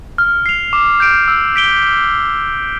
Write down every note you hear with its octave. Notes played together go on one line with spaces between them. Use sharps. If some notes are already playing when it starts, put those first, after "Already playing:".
F6
C7 F7
D6
G6 D7
E6
B6 D7 G7